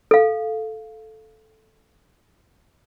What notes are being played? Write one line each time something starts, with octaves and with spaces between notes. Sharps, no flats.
A4 F5